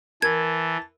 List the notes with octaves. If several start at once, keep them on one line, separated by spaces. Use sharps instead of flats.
E3 A#4 A5 G#6